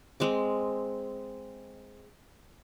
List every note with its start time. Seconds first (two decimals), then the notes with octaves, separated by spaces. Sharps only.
0.20 G#3 C4 D6